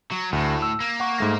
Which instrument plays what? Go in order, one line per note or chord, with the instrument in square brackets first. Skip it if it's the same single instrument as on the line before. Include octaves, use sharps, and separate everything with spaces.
[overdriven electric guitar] F#3
[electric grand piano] D2 [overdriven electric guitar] A2
[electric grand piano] E6
[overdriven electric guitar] A#3
[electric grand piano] F#5 C#6
G#2 A3 A#6